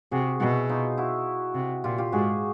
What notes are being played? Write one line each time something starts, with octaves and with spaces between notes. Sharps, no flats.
C3 F#4 G#4
B2 E4 F#4
D#4 F4
E4 F#4
C3
A#2 F4 G4
F4 G4
G#2 F#4 G#4